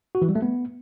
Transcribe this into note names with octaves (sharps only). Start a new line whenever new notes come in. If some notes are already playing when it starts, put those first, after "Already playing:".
F#4
E3
G3
A3
B3